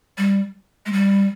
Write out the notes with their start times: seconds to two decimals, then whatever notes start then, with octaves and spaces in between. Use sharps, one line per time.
0.18 G3
0.86 G#3
0.93 G3